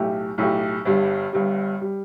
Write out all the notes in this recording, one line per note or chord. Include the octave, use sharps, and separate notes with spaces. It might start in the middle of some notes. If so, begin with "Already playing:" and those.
Already playing: B1 A2 A3 E4 G4
B1 A2 A3 E4 G4
G1 G2 G3
G1 G2 G3
G3